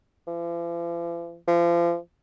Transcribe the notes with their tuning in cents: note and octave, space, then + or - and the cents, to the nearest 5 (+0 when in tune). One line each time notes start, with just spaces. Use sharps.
F3 -45
F3 -35